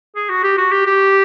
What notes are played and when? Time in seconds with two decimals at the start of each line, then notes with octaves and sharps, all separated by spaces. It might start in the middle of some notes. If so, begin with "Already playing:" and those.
0.15 G#4
0.30 F#4
0.44 G4
0.58 F#4
0.72 G4
0.86 G4